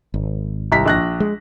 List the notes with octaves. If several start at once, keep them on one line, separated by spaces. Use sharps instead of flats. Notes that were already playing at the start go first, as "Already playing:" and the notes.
G#1
C2 A#5 B6
A#1 F#6 A#6
G#3